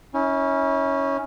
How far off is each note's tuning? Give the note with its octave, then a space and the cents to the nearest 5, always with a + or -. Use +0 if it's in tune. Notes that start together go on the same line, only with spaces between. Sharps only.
C#4 +0 E4 -40